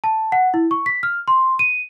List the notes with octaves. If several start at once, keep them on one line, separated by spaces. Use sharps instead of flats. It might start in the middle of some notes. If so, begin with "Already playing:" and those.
A5
F#5
E4
C#6
B6
F6
C6
D#7